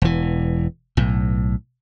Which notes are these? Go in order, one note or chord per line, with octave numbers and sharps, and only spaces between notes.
E1 E3
B1 A2